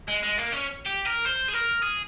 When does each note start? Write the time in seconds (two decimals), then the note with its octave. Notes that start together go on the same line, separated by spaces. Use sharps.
0.08 G#3
0.23 G#3
0.38 A#3
0.52 C#4
0.86 G4
1.05 A#4
1.25 C5
1.48 G#4
1.54 A#4
1.82 G#4